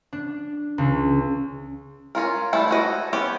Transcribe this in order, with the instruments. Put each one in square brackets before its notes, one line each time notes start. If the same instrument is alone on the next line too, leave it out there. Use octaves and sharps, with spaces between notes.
[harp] D4
C#2
[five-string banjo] C#4 F4 A#4
E3 G3 A3 E4
A3 E4 F#4 D#5
B3 C#4 G4